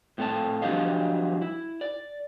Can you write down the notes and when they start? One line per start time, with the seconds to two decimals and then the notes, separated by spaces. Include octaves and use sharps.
0.18 A2 C4 A4 C#5 A5
0.62 F3 F#3 D4 G4 D#5 F5
1.42 E4
1.81 D5